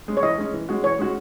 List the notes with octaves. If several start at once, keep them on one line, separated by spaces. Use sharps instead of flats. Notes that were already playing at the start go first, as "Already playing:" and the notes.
G#3 C#4
C#5
E3 D#5
G#3 C#4
E3
G#3 C#4 F#4
E3 C#5
G#3 C#4 F#4